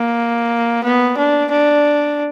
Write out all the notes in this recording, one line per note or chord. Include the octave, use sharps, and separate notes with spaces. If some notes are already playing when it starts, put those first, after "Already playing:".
Already playing: A#3
B3
D4
D4